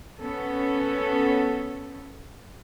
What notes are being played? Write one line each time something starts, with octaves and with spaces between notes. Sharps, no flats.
B3 C#4 A4